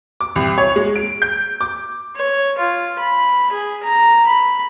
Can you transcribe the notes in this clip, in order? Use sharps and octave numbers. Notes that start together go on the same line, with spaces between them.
D6
C2
C#5
G#3
D7
G6
D6
C#5
F4
B5
G#4
A#5
B5